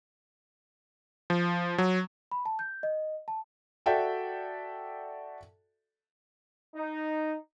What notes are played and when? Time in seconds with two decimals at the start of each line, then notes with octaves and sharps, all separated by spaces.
1.30 F3
1.78 F#3
2.31 B5
2.46 A5
2.59 G6
2.83 D#5
3.28 A5
3.86 F#4 A4 D5 E5 G5
6.76 D#4